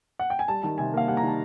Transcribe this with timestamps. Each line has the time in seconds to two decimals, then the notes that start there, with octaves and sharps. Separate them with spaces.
0.19 F#5
0.30 G5
0.39 G#5
0.48 G3 A5
0.63 D#3 A5
0.78 C3 G#5
0.94 A#3 F5
1.07 G3 F#5
1.17 A#5
1.23 D#3 A5